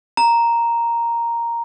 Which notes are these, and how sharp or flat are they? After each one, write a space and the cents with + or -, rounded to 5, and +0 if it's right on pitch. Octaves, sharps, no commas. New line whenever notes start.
A#5 +0